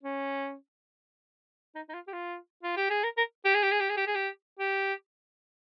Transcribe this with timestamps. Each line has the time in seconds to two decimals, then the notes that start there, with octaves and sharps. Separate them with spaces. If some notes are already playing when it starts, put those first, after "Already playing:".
0.03 C#4
1.75 D#4
1.89 D#4
1.94 F4
2.07 G4
2.13 F4
2.63 F4
2.77 G4
2.90 G#4
3.03 A#4
3.17 A#4
3.45 G4
3.55 G#4
3.63 G4
3.72 G#4
3.80 G4
3.90 G#4
3.97 G4
4.07 G#4
4.15 G4
4.59 G4